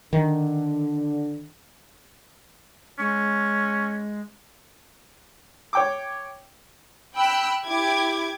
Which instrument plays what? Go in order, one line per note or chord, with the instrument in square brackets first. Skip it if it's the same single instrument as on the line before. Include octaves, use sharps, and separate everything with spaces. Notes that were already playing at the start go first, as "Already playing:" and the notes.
[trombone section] D3 [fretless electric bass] D#3
[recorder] G#3 [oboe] C#4
[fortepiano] C#5 G5 D6
[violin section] G5 B5 E6 F#6
E4 G4 D6 G#6